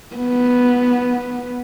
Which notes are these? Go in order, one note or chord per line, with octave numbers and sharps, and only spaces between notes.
B3